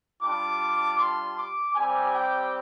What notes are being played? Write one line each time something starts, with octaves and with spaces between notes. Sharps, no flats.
G3 D4 F4 D6
C6
D6
G3 C4 G4 G#5
G5